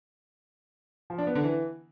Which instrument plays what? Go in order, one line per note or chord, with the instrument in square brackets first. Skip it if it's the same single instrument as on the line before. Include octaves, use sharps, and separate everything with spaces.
[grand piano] F3
D4
B3
D3
E3